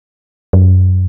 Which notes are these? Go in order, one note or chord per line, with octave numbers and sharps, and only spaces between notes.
F#2